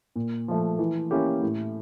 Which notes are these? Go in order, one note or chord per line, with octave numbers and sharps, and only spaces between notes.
A#2
F3 A3
E3
A#3 C#4 E4 G4
A2